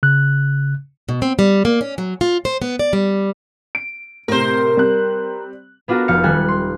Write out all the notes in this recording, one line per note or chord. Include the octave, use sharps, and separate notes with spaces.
C#3 F#6
B2
C4
G3
A#3
C#4
F#3
F4
C5
B3
D5
G3
D7
A2 C3 A#4 C5
G3 C4 F#6
B3 D4 F4 F#4 A4 A#4
F1 D#4 F5 C#7
D#1 G3 A4 G#5 F#6
C6